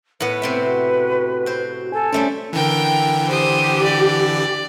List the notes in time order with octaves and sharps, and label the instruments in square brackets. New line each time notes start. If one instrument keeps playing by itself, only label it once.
[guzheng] A2 B3 [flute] B4
[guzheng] C3 C4 E5 [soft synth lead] B3
[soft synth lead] F#4
[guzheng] C4 C5
[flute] A4 [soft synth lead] G#5
[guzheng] G3 A3 C4 [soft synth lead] C#4
[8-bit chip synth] D3 E3 [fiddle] A#4 G5
[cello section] G4 [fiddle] C5 D#6
[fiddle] D5